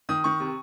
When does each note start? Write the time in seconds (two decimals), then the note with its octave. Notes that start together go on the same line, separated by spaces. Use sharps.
0.09 D#3 D#6
0.24 D#3 C#6
0.40 C3